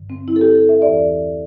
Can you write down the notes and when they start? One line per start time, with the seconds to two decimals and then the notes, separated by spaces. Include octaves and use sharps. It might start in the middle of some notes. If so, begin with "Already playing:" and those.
Already playing: G2 D3
0.10 C4
0.28 E4
0.36 A4
0.41 G4
0.55 A4
0.69 E5
0.82 E2 E3 D5